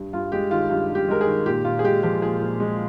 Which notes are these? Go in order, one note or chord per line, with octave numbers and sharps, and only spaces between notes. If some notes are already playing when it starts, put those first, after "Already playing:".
Already playing: G2
G2 F4
G#3 G4
D#3 F4
G2 F4
G2
G4
G#3 A#4
G#4
D#3
A#2 G4
A#2 F4
G#4
G#3 G4
F3 G4
A#2 G#4
A#2
G#3